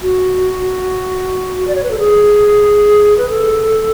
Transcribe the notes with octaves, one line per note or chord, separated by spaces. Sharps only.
F#4
D5
C#5
B4
A4
G#4
B4
A4